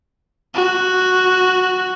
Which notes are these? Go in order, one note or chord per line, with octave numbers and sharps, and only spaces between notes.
F#4